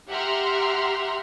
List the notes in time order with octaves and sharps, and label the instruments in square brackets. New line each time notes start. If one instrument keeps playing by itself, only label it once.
[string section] G4 E5 F#5 A#5 C6 F6